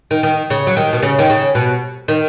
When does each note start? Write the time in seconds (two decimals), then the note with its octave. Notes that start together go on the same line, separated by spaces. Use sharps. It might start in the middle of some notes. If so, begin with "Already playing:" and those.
0.11 D#3
0.23 D#3
0.50 C#3
0.67 F#3
0.77 D#3
0.93 B2
1.02 C#3
1.19 D#3
1.30 C#3
1.55 B2
2.08 D#3